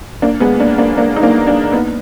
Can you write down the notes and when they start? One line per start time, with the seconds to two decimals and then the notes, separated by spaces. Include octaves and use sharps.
0.22 A#3 D4
0.40 G#3 B3
0.60 A#3 D4
0.78 A#3 D4
0.97 A#3 D4
1.16 D#4
1.23 A#3 D4
1.47 A#3 D4
1.72 B3 D#4